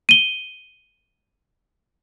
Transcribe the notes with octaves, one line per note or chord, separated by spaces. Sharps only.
D#7 G7